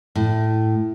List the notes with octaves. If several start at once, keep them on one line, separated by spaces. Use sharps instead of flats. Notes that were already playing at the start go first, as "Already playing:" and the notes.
A2